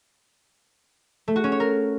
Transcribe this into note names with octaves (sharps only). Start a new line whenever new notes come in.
A3
F#4
C#4
C#5
A#4